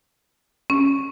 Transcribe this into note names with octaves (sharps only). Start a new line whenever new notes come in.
C#4